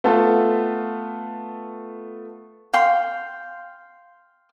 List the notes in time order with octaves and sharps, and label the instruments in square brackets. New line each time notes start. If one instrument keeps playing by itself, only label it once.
[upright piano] A3 B3 F4 A4
[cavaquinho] F5 G5 C6